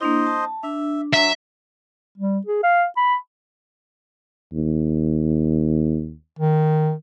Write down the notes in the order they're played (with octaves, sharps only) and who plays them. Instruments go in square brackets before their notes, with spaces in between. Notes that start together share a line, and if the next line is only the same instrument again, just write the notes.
[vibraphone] A#3 D4 E4 [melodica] C5 D#5
[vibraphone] A5
[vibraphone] D4 [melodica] E5
[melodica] F#3 [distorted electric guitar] E5
[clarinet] G3
G#4
F5
B5
[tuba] D#2
[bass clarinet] D#3